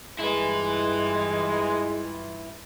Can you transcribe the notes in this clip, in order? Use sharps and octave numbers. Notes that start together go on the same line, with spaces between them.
G2 E3 G#3 E4 F4 B4